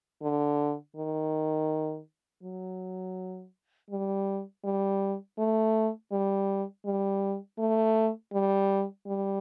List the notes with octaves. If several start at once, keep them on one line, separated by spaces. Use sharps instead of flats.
D3
D#3
F#3
G3
G3
A3
G3
G3
A3
G3
G3